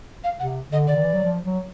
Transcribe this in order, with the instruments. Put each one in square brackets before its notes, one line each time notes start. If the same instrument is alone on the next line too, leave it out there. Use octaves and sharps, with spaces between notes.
[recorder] F5
[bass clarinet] C3 [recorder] F#5
[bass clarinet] D3 [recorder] D#5
[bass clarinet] D3 [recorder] D5
[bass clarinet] D#3
E3
F#3
F3
F#3